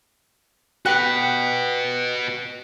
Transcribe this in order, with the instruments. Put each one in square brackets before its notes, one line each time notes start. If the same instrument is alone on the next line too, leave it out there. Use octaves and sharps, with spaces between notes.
[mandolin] B3 G4 F#5 [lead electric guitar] F#4 B4